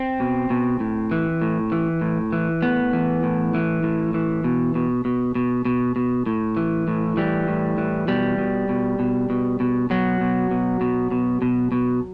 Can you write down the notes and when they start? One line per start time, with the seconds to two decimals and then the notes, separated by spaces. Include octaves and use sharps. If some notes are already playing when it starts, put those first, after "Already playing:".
Already playing: C4
0.20 B2
0.50 B2
0.80 A2
1.11 E3
1.42 A2
1.72 E3
2.01 A2
2.33 E3
2.62 A2 B3
2.93 E3
3.23 A2
3.54 E3
3.83 A2
4.14 E3
4.44 B2
4.75 B2
5.05 B2
5.35 B2
5.65 B2
5.96 B2
6.26 A2
6.57 E3
6.88 A2
7.17 E3 G3
7.48 A2
7.78 E3
8.08 B2 G3
8.38 B2
8.69 B2
8.99 B2
9.30 B2
9.60 B2
9.90 B2 F#3
10.21 B2
10.51 B2
10.81 B2
11.11 B2
11.42 B2
11.72 B2